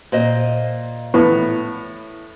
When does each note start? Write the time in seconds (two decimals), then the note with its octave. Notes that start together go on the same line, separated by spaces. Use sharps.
0.12 A#2 C5 D#5
1.14 A2 B3